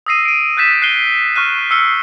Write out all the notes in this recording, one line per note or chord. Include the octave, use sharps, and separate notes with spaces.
D#6 E6 A#6 C7 D#7
D7 D#7
E6 F#6 G6 A6 B6 E7
F#6 C7 D#7 G7
C#6 F6 F#6 D#7
E6 F6 C7 C#7 G7